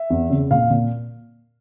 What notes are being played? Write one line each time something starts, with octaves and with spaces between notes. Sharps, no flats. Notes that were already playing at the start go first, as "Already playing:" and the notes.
Already playing: E5
E2
C#3
A#2 F5
A#2